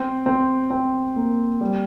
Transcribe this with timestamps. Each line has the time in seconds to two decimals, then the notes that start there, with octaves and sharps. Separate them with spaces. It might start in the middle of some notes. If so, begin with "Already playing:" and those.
Already playing: C4
0.26 C4
0.71 C4
1.16 A#3
1.61 G3